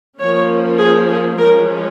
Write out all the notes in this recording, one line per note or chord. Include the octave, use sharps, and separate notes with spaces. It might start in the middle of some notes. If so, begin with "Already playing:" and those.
F3 A#3 C#4 C#5
G#4
G#4
F3 G#3 C#4 A#4